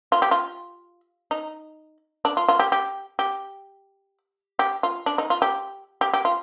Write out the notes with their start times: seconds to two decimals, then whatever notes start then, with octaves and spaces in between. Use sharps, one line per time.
0.12 F4
0.22 G4
0.31 F4
1.31 D#4
2.25 D4
2.37 F4
2.49 F4
2.60 G4
2.72 G4
3.19 G4
4.59 G4
4.83 F4
5.06 D4
5.18 D#4
5.30 F4
5.42 G4
6.01 G4
6.14 G4
6.25 F4